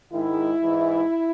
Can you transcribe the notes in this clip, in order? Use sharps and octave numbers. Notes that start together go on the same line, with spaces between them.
G#2 D#3 G#3 E4
G#2 E3 G#3